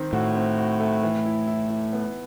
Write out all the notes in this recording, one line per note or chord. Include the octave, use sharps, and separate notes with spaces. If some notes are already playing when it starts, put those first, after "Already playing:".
Already playing: D#3 C4
A2 F#4
C4
F#4
A3
E3
E4
E4
E4
B3